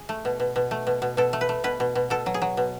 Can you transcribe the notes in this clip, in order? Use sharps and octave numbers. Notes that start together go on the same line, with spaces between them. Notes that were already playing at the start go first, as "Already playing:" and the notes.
Already playing: G#4
A3
B2
B2
B2
A3
B2
B2
B2 A4
A3
B4
A3
B2 B4
B2
B2
B2 A4
F#3
G#4
F#3
B2